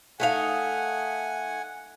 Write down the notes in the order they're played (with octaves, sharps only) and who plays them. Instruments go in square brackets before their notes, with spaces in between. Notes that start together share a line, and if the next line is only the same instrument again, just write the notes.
[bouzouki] A3 D#4 F5 [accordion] F#5 G#5